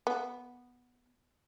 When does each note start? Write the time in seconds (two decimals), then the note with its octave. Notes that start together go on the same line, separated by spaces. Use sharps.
0.07 B3